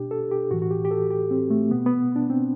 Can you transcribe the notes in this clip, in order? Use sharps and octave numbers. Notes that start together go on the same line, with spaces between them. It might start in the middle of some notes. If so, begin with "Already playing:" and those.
Already playing: B2 D4 G4
A4
G4
A2 E3 F#4
F#4
G4
G4
A4
G4
C4
A3
B2 B3
B3
D4
C4